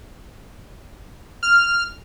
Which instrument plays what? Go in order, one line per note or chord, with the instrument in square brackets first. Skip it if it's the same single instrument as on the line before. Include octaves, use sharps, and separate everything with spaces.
[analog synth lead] F6